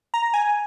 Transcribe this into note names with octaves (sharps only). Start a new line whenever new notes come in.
A#5
G#5